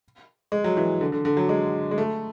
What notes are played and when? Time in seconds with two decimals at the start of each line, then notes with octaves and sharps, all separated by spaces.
0.52 G#3
0.64 F#3
0.77 E3
1.01 D3
1.12 D3
1.25 D3
1.37 F#3
1.49 G#3
1.91 G#3
1.98 A3